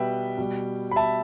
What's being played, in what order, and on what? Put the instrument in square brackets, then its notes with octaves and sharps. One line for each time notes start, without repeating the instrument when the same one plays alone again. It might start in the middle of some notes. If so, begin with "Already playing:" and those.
Already playing: [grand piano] B2 G3 B4 E5 G5 B5
B2 G3
B5
E5 A5